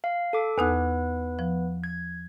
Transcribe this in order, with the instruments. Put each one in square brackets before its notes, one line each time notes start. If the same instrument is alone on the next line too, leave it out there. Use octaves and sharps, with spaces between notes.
[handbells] F5
A4 D6
[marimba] E2 D#4 F#6 [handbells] B3 B4
[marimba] F3
[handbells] G#6